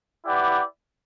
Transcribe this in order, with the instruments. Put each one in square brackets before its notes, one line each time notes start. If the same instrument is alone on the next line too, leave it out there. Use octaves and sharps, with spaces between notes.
[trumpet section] E4 G4 B4 D5 F#5